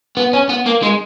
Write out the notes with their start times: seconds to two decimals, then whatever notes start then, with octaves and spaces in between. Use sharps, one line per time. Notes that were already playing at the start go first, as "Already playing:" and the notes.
0.17 B3
0.33 C#4
0.49 B3
0.66 A#3
0.83 G#3